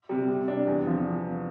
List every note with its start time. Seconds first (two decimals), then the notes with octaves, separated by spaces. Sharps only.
0.09 C3 G3
0.28 C3
0.47 G3 D4
0.67 E2
0.86 C3 F3